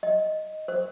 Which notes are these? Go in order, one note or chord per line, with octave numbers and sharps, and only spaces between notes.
D#5
C5